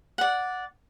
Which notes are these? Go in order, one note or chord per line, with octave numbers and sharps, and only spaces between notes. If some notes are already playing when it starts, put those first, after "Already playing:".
D5 F#5